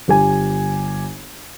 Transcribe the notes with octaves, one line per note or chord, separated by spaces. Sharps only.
G1 G4 G#5